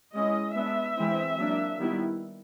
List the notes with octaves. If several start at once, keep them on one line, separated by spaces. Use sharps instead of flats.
G#3 C#4 E4 D#5
G#3 B3 D4 E5
E3 G#3 C4 E4
F#3 A#3 D4
D#3 G3 B3 E4